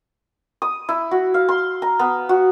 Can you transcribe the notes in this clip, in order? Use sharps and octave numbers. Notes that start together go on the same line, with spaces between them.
D#6
E4
F#4
F5
C6
A#5
B3
F#4